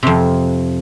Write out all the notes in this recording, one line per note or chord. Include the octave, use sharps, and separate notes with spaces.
F2 C3